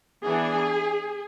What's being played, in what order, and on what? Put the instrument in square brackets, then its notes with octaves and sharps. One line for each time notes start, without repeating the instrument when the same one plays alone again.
[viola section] E3 B3 D4 G#4